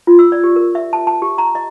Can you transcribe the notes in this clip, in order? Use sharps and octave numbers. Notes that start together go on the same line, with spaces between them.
F4
E6
D5
G4
A#4
E5
A5
A5
G4
A#5
D#5